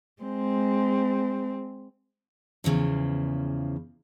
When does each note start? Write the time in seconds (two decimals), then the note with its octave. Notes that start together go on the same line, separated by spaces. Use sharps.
0.23 G#3 C4
2.64 E2 C#3 E3 F3